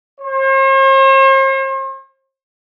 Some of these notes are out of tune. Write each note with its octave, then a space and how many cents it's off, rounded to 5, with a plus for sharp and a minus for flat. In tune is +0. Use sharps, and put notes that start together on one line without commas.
C5 +45